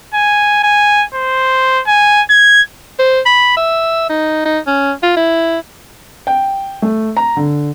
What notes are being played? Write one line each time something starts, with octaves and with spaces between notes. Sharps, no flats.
G#5
G#5
C5
G#5
G#6
C5
B5
E5
D#4
D#4
C#4
F4
E4
G5
A3
A#5
D3